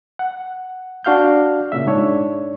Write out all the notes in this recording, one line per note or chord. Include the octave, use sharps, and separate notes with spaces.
F#5
D4 F#4 F5 F6 G6
A#2 C#3 E5
G#2 D4 C#5